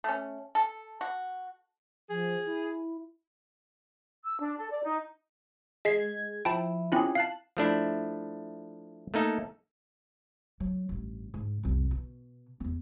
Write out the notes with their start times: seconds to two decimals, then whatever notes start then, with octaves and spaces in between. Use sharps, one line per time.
0.04 A3 C#4
0.55 A4
1.01 F#4
2.10 F3 G#4
2.45 E4
4.25 E6
4.39 D4
4.57 A4
4.71 D5
4.83 D#4
5.85 G#3 D#5 G#6 B6 C7
6.45 F3 E4 G5 A5 B5
6.92 C4 C#4 E4 F4 G4 G#4
7.15 F5 A5 F#6 C7
7.57 F3 A3 D4 E4
9.14 A3 A#3 D#4 A4
10.60 F#3
10.89 A1 G2
11.34 G#2
11.63 C2 F2
11.91 B2
12.60 E2 B3